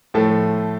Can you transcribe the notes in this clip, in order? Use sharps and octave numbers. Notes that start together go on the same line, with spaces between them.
A2 F3 A3 A4